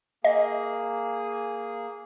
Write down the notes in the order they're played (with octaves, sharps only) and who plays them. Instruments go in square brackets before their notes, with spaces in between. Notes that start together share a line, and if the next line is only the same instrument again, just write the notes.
[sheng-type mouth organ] A#3 G#4 [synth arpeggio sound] D#5